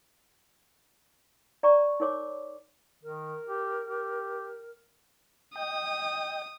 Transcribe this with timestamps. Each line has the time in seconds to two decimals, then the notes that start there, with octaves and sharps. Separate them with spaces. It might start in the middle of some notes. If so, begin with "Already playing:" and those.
1.63 D5 A#5 C#6
2.00 D#4 A#4 C#5 D6
3.04 D#3 A#4
3.48 G4
3.87 G4
5.56 D#5 G5 D#6